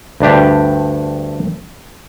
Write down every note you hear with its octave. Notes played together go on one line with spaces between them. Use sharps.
D2 G2 D4 G4